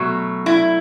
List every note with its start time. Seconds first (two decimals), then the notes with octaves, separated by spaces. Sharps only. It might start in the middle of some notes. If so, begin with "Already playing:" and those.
Already playing: B2 F#3 A3
0.46 E4